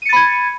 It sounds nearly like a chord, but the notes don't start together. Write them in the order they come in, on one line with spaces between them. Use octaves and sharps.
D#7 C#7 A6 B5 G#6